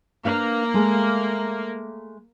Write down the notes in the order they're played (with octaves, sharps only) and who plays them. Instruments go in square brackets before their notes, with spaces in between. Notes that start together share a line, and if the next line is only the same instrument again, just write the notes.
[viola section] A#3 [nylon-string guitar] D4 B4 F5
[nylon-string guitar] G#3 A3 A4